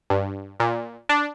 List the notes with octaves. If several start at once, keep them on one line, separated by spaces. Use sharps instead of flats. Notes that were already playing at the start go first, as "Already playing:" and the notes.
G2
A#2
D4